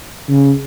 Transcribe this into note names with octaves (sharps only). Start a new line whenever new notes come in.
C#3